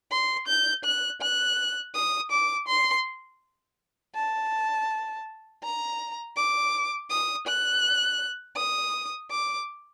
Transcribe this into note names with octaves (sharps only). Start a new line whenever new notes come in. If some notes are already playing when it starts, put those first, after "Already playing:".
C6
G6
F#6
F#6
D#6
D6
C6
A5
A#5
D6
D#6
F#6
D#6
D6